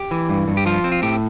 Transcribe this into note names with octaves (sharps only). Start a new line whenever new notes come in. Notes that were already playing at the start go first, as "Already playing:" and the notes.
Already playing: G4
E3
G2
G2
G4
F3 F4
C4
F4
A2 G4